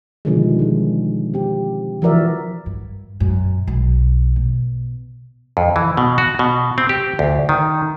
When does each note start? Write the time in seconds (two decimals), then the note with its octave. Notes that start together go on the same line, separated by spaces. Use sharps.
0.25 B2 D3 D#3 F3 G3 G#3
0.59 D#3 G#3
1.34 C4 G4
2.02 E3 F3 F#4 A#4 D5 E5
2.66 G2
3.20 F#2 A#2
3.67 B1
4.36 B2
5.57 F2
5.76 E3
5.97 B2
6.18 F#4
6.39 B2
6.78 C4
6.89 G4
7.19 D2
7.49 D#3